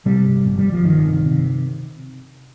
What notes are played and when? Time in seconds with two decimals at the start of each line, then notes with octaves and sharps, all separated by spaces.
0.06 C3 G3
0.25 G1
0.45 G1
0.59 G3
0.65 G1
0.73 F3
0.85 G1 D#3
1.05 C3
1.25 C3